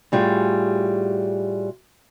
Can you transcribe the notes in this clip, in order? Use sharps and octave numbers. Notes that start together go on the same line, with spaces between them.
A2 G3 F4 F#4 G#4